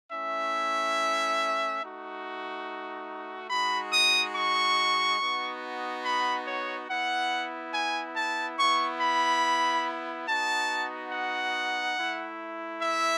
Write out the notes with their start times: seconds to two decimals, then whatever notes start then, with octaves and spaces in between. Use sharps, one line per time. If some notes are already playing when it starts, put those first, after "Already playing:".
0.12 A3 C#4 E4 E5
1.82 A3 D#4 F#4
3.50 G#3 D#4 F#4 B5
3.93 D#6
4.36 C#6
5.20 B3 D#4 F#4
6.05 B5
6.47 C#5
6.89 B3 E4 F#5
7.74 G#5
8.16 A5
8.59 B3 E4 C#6
9.00 B5
10.28 B3 D#4 F#4 A5
11.12 F#5
11.96 A3 E4
12.82 E5